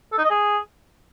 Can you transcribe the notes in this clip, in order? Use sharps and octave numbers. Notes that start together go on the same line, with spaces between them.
A4
D#4
D#5
G#4